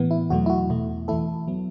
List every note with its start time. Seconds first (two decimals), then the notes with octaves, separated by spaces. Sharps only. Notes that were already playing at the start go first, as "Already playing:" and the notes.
Already playing: A2 E3 B3
0.11 E4
0.30 E2 B2 F#3 A3 F#4
0.46 E4
0.50 F#4
0.70 E2 B2 A3
1.08 E2 E3 A3 E4 A4
1.48 F#3 B3